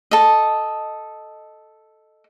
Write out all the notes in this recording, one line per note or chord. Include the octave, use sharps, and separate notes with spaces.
A4 D#5